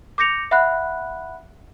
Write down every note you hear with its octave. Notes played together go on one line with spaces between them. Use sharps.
D6 G6 A#6 C#7 F7
E5 F#5 B5 F#6